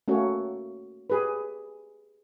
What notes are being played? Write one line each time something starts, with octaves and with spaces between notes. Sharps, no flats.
A3 A#3 C#4 F#4 C#5
G4 G#4 B4